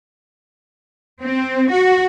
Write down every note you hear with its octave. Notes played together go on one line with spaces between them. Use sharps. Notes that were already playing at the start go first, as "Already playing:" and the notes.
C4
F#4